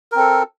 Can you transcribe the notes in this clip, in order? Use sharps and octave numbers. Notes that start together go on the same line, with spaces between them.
C4 A4 A#4